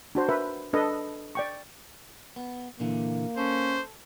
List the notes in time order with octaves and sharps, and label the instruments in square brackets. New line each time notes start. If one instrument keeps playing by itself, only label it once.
[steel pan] D4 F#4 C5
A#4 B4 E5
D4 A4 B4 D#5
D5 G5 C#6
[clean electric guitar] B3
[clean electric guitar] A#2 D3 E3 [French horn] A#3
[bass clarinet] C#4 [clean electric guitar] A4 [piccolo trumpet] C5